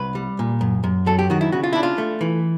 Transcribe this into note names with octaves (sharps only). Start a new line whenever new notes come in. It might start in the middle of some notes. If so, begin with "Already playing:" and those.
Already playing: C2 B4
G3
A#2
F#2
F#2
F#3 A4
G4
D#3 F#4
E4
C#3 F#4
F4
D4 E4
F4
A3
E3